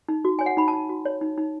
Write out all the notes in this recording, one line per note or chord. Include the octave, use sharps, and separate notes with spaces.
D#4
F#4
C#5 G#5
F#5
D#4 B5
A5
D#4
F#4
C#5
D#4
D#4